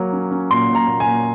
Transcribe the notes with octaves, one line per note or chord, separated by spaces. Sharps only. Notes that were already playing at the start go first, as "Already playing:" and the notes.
Already playing: F#3 A#3
C#4
C#4
A#2 C6
A#2
A#5
A#2
G#5
A#2